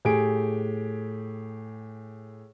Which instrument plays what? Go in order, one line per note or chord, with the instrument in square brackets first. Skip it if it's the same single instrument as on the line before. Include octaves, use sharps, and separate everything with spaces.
[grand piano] A2 G4 G#4 G#5 D7